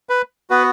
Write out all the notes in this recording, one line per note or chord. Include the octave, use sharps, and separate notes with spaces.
B4
B3 F#4 B4